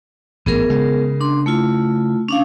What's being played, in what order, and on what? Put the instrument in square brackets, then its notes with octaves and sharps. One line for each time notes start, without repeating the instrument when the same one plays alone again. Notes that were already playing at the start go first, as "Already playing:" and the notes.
[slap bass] A1 G#2 [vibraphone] B3 G#4 A#4
[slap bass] C#3 G#3
[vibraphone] D4 C6
A3 E4 F4
C#4 D4 F5